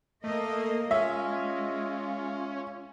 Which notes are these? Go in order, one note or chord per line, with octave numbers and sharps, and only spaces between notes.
A3 A#3 D#5
G#3 C#4 F4 E5